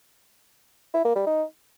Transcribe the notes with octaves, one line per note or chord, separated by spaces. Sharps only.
E4
A#3
G3
D#4